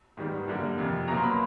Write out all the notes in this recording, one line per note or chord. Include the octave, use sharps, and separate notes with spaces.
G#2 D#3 G3 B3
F#2 D3 G3 A#3
F2 C3 F3
B2 F#3 A#3 A#5
C6
B5